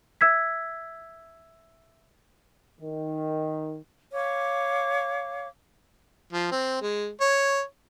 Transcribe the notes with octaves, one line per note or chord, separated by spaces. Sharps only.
E5 E6 G#6 B6
D#3
C#5 F5 D6
F3
C4
G#3
C#5